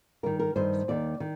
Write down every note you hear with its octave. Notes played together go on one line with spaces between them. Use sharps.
G2 D#3 A#4
A#4
G2 D#3 C5
D#2 D#3 D5
D#3